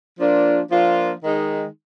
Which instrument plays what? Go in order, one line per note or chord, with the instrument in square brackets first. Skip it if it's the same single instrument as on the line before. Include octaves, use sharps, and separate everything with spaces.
[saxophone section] F3 A#3 D4 F4
F3 A#3 D4 F4
D#3 G#3 D#4